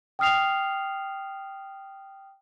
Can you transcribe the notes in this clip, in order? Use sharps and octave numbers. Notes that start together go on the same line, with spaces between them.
G5 D#6 F6 C7 F7